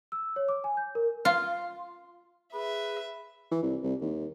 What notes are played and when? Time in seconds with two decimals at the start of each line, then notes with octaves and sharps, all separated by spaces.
0.12 E6
0.36 C#5
0.49 D6
0.64 G#5
0.77 G6
0.95 A#4
1.25 F4
2.53 G#4 B4 E5
3.52 E3
3.63 C2
3.83 C2
4.02 D#2